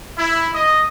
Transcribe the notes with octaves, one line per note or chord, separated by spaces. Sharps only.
E4
D#5